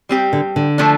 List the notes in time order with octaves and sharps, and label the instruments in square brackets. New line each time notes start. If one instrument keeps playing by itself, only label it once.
[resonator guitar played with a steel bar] G3 C4 G4
[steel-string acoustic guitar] D3
D3
[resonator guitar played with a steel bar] F3 A3 D4